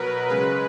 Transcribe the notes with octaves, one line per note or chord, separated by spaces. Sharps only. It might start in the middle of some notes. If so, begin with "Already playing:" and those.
Already playing: B2 F#3 A#4 B4
C#3 G#3 B4